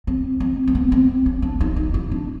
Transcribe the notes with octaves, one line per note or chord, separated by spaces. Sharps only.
C4
C4
C4
B3
C4
C#4
D4
D#4
D#4
E4
D4